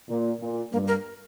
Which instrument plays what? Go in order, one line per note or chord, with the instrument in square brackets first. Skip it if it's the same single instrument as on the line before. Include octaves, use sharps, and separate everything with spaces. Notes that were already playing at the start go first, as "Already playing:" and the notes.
[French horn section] A#2
A#2
[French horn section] G2 [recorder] A#3
[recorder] A#4